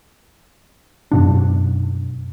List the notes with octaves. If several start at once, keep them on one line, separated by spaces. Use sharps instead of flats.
F#2 B2 D4